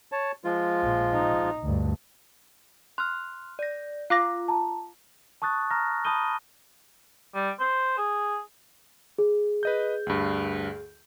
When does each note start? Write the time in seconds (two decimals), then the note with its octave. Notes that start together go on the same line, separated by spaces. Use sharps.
0.12 C#5 A5
0.44 F3 G#3 F4
0.83 A#1
1.13 D#4
1.63 D2 G2
2.98 C6 F6 F#6
3.59 D5 A#6
4.10 F4 F5 D6 A#6
4.48 A5 A#5
5.42 A5 C#6 D#6 F#6 A6
5.71 A#5 F6 A#6
6.05 A5 B5 D#6 G6 D#7 G7
7.35 G3
7.60 C5
7.98 G#4
9.18 G#4
9.63 B4 D#5 G6
10.07 D2 G2